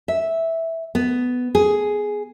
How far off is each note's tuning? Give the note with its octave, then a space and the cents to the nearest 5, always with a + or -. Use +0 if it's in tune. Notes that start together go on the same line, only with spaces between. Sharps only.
E5 -10
B3 +10
G#4 +5